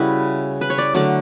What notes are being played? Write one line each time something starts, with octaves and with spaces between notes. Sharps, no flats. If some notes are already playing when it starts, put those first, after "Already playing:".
Already playing: C#3 G3 E4 F#4 B4
B4
C#5
D5
D3 F#3 A3 D5